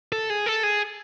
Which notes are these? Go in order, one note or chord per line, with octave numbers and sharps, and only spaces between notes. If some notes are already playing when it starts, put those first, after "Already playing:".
A4
G#4
A4
G#4